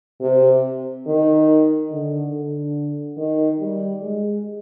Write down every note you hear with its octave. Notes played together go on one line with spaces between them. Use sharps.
C3
D#3
D3
D3
D#3
G3
G#3